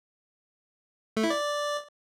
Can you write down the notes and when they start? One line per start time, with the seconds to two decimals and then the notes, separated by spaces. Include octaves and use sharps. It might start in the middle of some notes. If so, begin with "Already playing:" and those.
1.17 A3
1.23 E4
1.30 D5